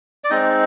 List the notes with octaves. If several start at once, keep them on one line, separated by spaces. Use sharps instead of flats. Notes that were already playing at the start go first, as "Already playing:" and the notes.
D5
G#3 C4 D#4 D#5